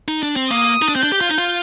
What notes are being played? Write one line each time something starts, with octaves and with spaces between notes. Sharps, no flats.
D#4
D4
C4
A#3 D#6
D#4
D4
C4 G6
D4
G4
F4
D#4
F4